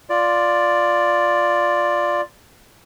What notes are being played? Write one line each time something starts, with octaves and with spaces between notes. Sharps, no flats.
F4 D5